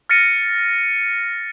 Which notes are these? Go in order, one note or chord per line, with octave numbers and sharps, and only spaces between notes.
F6 A6 A#6 C#7 D#7